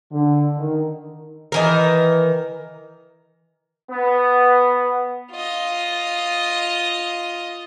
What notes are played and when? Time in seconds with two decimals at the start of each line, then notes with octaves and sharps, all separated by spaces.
0.11 D3
0.58 D#3
1.52 D#3 E3 A#4
3.89 B3
5.32 F4 D#5